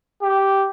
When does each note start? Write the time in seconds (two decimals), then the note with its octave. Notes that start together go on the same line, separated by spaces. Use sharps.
0.22 G4